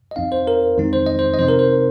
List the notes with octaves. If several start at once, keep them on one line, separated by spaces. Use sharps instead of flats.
D#5
F2 F3 C4 D#4 F5
C5
A#4
F2 D#3 G#3 C4 D#4
C5
D#5
C5
D#5
C3 F3 C4 D#4 C5
A#4
C5